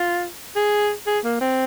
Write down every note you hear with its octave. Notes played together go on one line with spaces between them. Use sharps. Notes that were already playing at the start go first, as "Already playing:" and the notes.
Already playing: F4
G#4
G#4
A#3
C4